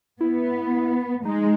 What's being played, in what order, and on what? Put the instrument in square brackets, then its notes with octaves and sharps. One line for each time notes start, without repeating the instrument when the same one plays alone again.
[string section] B3 [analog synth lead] E4
[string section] G#3 [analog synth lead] D#4